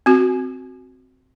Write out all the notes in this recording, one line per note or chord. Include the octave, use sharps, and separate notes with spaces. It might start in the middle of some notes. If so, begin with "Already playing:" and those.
C4 F#4